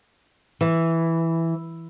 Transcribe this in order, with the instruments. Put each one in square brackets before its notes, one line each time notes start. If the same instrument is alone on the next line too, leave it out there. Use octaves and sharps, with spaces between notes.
[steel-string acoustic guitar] E3